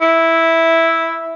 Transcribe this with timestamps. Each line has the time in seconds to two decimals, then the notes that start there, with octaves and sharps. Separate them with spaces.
0.01 E4